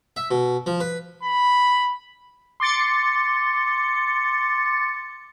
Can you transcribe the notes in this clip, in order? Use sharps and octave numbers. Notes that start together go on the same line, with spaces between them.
E5
B2
F3
B4
B5
C6 D6 A6 C#7